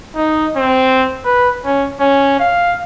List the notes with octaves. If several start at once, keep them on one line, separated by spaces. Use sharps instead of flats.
D#4
C4
B4
C#4
C#4
F5